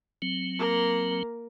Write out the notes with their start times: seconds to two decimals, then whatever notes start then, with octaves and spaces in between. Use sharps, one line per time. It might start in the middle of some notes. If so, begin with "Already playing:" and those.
0.22 F#3 C4
0.59 A#3 A#4